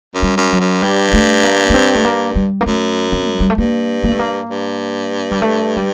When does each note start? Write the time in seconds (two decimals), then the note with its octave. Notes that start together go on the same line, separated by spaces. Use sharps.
0.14 F#2
0.22 G3
0.37 F#2
0.53 F#3
0.60 F#2
0.82 G2 G3
1.13 A3
1.44 A#3
1.70 A#3
1.74 C4
1.95 A3
2.05 A#3
2.36 G3
2.61 A#3
2.66 F#2 A3
3.12 C4
3.31 F#3
3.40 G3
3.50 A3
3.58 G2 A#3
4.04 A#3
4.12 A3
4.19 A#3
4.49 G2
5.31 G3
5.42 A3
5.77 G3